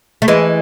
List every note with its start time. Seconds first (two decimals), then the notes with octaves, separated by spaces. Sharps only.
0.22 A3
0.28 E3 G#3